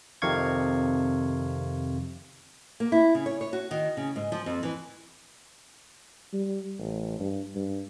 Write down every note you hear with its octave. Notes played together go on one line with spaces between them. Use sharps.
F2 C3 D#3 F5 C#6 G#6
A#3
E4
C#3
C#5
C#5
F#4
D#3
C#3
G#2
F3
F2
E3
G3
A1
G2
G2